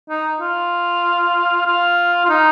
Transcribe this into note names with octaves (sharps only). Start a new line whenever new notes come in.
D#4
F4
F4
F4
D#4